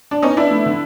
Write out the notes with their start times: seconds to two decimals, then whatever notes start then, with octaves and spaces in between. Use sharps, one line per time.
0.11 D4
0.22 B3 C#4 D#4
0.37 B3 D4 E4
0.51 A3
0.66 D3